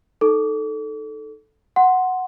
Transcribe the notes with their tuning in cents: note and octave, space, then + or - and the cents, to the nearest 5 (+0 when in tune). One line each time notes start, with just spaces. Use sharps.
D#4 +0 A4 -5 D6 -40
F#5 +0 C6 +0